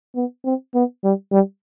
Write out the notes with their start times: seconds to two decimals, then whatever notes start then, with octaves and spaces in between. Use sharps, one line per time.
0.16 B3
0.45 C4
0.75 B3
1.04 G3
1.32 G3